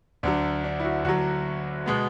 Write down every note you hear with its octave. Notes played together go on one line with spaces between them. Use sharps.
D2 D3 F#3 D4
D4
E4
F#4
D2 D3 F#3 F#4
B2 G#3 B3